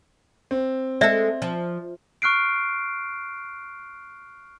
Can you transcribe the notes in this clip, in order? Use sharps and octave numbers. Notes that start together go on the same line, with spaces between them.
C4
G#3 A4 D5 E5
F3
C#6 F6 F#6 C7 D7